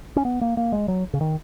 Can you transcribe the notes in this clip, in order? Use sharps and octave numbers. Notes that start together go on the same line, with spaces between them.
C#4
B3
A#3
A#3
G#3
F#3
C#3
D#3